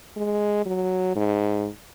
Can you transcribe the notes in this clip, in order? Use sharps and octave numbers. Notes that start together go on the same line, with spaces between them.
G#3
F#3
G#2